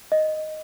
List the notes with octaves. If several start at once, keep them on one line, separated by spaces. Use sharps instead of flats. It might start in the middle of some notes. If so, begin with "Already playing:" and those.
D#5